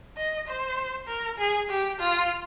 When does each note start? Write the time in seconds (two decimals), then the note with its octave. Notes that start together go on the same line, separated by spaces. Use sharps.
0.17 D#5
0.48 C5
1.08 A#4
1.38 G#4
1.70 G4
2.00 F4